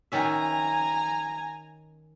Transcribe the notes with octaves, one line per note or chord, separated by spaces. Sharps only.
D#3 C#4 E5 G#5 A#5